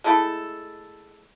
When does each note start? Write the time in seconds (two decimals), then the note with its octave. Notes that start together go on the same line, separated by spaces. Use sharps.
0.04 G#3 A3 E4 A4